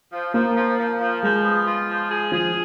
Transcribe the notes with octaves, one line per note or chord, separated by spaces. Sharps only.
F3
F3 A#3
F3
F3
F3
F3 G#3
B3
F4
F3
G#4
F3 G#4